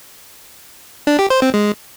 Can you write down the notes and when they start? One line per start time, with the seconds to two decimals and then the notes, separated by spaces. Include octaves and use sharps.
1.07 D4
1.19 G4
1.30 C5
1.42 C4
1.54 G#3